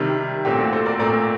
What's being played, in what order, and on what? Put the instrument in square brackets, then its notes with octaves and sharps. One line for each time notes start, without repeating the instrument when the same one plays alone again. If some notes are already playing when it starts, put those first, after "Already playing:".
Already playing: [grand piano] C3 D#3 G3
A#2 A3 C4 G4
F#4
A4 C5
A#4 D5
A#2 A3 C4 A#4 D5